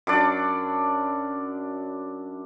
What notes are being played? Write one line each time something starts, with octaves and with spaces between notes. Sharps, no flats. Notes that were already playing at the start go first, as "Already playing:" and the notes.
F#2 D4 D5